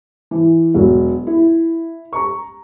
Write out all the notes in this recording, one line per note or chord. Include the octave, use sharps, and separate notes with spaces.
E3
E1 F#3
E4
A#5 C#6